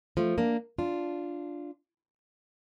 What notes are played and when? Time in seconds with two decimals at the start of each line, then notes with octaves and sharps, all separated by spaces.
0.17 F3 A3
0.38 A#3 D4
0.79 D4 F4